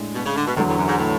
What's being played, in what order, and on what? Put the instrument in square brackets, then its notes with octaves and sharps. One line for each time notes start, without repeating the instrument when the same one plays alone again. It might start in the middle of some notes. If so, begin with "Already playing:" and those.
Already playing: [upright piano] A2 G#3 D4
[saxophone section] B2
C#3
D3
B2
[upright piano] E2 D3 F#3 [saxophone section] A2
[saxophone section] A2
F#2
G#2
A2